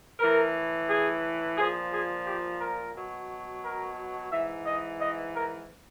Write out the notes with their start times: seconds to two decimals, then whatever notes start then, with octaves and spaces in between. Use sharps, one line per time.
0.20 A2 E3 A#4
0.88 G#4
1.58 A#2 F3 G#4
1.92 G#4
2.26 G4
2.60 A#4
2.95 B2 F#3
3.63 A#4
4.31 G#2 E3 E5
4.66 D#5
5.00 D#5
5.34 A#4